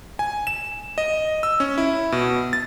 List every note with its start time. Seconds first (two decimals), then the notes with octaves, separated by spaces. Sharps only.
0.19 G#5
0.47 E7
0.98 D#5
1.43 E6
1.60 C#4
1.78 E4
2.12 B2
2.53 A6